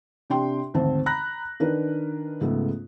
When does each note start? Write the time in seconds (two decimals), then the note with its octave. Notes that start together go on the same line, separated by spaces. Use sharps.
0.30 C3 D4 G4 G5 C6
0.74 G#1 D2 C4 C5 A5
1.06 A#5 B5 F#6 A#6
1.60 D#3 D4 A#4 B4
2.41 C#2 G#2 C#3 A3 B3